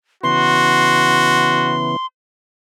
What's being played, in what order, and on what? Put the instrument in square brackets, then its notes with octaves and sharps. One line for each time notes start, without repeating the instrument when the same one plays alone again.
[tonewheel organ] C#3 E3 B3 [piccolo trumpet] F#4 [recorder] C6